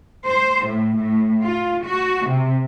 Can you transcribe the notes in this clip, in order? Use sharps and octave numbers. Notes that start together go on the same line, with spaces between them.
C5
A2
A2
F4
F#4
C3